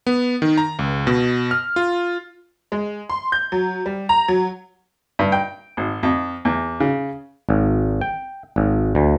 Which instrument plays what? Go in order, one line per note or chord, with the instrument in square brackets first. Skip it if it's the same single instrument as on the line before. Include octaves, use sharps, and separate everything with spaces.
[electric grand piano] B3
D#3
A#5
C#2
B2
F6
F4
[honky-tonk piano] G#3
C6
G6
F#3
G3
A#5
F#3
[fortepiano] G2
G5
G#1
F2
E2
C#3
[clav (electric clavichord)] G#1
G5
G#1
D2